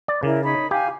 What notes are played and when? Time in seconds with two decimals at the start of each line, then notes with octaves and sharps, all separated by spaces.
0.08 D5
0.23 C#3 E4 A#4
0.43 D#4 C#5 B5
0.71 G4 F5 G#5